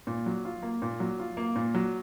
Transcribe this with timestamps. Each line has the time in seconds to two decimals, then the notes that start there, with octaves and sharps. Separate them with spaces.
0.07 A#2
0.26 F#3
0.45 F4
0.63 A#3
0.82 A#2
1.00 F#3
1.19 F4
1.37 A#3
1.56 A#2
1.74 F#3